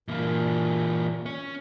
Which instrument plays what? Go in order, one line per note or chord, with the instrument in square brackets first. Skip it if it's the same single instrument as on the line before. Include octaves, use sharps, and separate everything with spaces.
[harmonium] A#2 [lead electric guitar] E3 A#3
[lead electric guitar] C#4 C#5